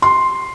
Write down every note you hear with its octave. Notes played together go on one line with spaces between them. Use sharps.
C6